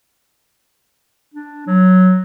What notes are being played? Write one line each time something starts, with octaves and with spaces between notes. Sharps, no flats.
D4
F#3